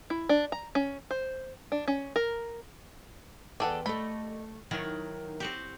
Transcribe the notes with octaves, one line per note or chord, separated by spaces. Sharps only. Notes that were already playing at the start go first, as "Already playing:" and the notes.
E4
D4
A#5
C#4
C5
D4
C#4
A#4
E2 G#4 A4 B4 D5 F#5 G5
A3 G4 A4 A#4 D#5 B5
D#3 F#3 E4
C4 F#4 G4